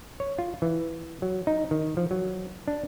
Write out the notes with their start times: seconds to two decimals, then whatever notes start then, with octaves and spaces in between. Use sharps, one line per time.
0.20 C#5
0.38 F4
0.62 E3
1.22 F#3
1.47 D#4
1.71 D#3
1.97 F3
2.11 F#3
2.68 D4